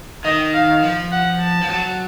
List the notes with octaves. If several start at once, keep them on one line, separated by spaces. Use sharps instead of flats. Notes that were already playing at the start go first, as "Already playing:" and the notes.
D#3 D#5
F5
F3
F#5
A5
F3
F#3